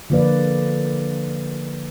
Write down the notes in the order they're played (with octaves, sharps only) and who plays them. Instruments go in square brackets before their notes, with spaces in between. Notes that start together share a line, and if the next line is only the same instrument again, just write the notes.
[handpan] D3 F3 A#3 B4 D5